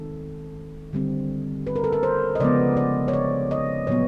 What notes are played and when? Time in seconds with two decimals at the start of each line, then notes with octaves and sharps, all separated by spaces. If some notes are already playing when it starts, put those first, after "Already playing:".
Already playing: D#3 G#3 C4 A4
0.93 D3 G3 C4
1.67 B4
1.76 A#4
1.84 A4
1.93 A#4
2.03 C5
2.35 D#5
2.40 C#3 F3 G#3 B3 D5
2.77 D5
3.08 C#5
3.13 D5
3.51 D#5
3.87 A#2 F#3 B3 C#5